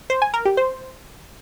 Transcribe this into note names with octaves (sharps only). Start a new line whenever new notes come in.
C5
G#5
A#4
G4
C5